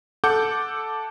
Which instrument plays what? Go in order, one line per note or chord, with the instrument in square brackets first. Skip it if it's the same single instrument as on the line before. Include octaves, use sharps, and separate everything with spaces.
[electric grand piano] A4 F#5 D6 G6